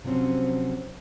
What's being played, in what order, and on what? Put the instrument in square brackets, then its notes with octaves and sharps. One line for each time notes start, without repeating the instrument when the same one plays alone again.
[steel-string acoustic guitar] C3 F3 F#3 C4 C#4